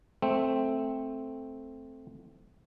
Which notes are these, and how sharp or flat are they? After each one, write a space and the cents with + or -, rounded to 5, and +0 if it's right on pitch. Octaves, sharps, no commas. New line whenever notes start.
A3 +0 C4 +0